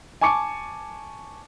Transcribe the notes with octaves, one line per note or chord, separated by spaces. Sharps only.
G#5 A5 C#6 D6 C#7